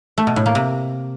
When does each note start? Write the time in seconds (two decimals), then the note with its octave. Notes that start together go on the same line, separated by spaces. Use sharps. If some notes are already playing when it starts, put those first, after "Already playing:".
0.18 A3
0.27 B2
0.36 A2
0.46 A#3
0.55 C3